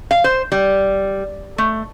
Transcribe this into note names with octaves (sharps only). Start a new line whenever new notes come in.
F5
C5
G3
A3